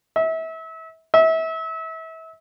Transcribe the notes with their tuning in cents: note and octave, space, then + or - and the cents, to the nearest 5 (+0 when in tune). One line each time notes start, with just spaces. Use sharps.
E5 -30
E5 -30